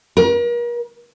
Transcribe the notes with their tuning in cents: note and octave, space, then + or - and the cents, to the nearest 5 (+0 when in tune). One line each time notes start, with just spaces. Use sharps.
A#4 +40